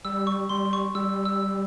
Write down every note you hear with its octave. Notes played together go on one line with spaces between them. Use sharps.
G3 E6
C#6
G3 C6
C#6
G3 E6
E6